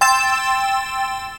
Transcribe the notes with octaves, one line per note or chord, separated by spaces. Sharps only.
G5 C6 E6 A6 E7